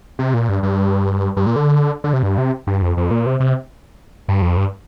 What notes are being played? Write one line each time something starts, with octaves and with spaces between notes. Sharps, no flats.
C3
A#2
G2
G2
G2
A#2
D3
D3
C3
G2
C3
G2
F2
F2
A#2
C3
C3
G2
F2
G2